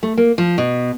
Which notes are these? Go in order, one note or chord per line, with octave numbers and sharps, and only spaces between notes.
A3
A#3
F3
B2